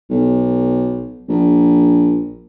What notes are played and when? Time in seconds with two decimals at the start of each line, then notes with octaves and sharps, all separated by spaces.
0.10 B1
1.29 A#1